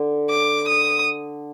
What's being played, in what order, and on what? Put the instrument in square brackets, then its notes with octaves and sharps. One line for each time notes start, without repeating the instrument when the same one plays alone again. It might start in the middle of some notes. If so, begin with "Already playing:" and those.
Already playing: [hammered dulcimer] D3
[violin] D6
D#6